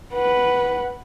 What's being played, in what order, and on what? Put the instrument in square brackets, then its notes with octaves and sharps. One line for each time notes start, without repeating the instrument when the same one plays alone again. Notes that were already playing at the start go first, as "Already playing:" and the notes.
[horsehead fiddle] B4 F#5